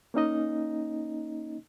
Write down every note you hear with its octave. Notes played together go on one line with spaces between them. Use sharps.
A#3 C#4 D#4 D#5